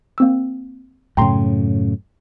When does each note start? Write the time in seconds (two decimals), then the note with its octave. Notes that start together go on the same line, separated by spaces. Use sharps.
0.18 A#3 C4 E6
1.17 F#2 A2 C#3 G5 A#5 C6